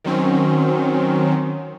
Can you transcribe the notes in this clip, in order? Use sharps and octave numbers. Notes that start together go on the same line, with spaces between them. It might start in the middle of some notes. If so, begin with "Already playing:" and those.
D#3 F#3 C4 C#4